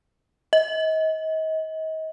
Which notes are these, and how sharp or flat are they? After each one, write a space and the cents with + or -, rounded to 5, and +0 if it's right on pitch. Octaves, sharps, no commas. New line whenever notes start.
D#5 +35